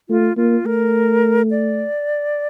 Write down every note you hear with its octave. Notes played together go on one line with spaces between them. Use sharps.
A3 F4
A#3 F4
A3 A#4
D5